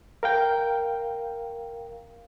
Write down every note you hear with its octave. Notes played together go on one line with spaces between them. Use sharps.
A#4 F5 G5